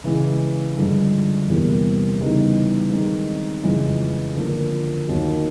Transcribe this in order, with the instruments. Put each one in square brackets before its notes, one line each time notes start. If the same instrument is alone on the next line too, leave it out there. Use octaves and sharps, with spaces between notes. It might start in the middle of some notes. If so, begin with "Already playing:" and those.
[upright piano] C#3 E3 G#3
G2 D3 F3 G#3
E2 C3 E3 G3 A#3
C#3 E3 G3 B3 D#4
D#3 G#3 C4 D#4
F2 C#3 E3 G#3
D3 F3 A#3
D#2 D#3 F#3